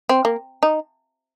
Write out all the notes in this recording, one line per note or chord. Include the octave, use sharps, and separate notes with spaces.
C4
A#3
D#4